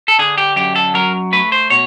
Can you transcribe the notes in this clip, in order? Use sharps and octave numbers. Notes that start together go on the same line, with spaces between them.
A4
D3 G#4
G4
F#2 G4
A4
F#3 A#4
A3 B4
C5
B2 C#5